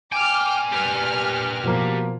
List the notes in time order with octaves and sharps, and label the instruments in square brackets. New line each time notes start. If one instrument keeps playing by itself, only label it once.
[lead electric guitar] A#2 G#5 [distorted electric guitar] G5 [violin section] D6 F6
[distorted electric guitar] G4 B4 [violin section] F6
[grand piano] B2 F3 A#3